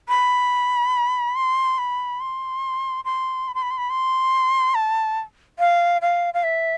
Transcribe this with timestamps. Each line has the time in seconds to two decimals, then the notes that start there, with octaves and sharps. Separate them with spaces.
0.09 B5
1.36 C6
1.78 B5
2.21 C6
3.05 C6
3.48 B5
3.55 C6
3.62 B5
3.71 C6
3.78 B5
3.90 C6
4.75 A5
5.59 F5
6.02 F5
6.34 F5
6.43 E5